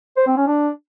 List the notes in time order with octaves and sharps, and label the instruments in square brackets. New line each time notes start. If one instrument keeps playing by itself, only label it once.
[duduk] C5
C4
C#4
D4